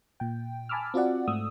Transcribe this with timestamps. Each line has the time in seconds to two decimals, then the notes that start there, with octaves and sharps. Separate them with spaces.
0.20 A#2 G5
0.69 G#5 A5 B5 D6 E6 F6
0.94 C4 F4 F#4 D5 F#5
1.27 G#2 A3 D#6 E6